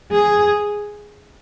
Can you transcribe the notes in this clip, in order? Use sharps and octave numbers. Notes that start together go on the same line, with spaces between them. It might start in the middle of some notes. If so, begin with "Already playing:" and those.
G#4